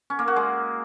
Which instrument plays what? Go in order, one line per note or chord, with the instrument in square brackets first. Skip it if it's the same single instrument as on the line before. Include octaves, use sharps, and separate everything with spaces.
[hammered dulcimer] C#4
A#3
F#4
G#3